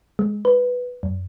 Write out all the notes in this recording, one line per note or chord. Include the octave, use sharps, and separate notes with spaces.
G#3
B4
F#2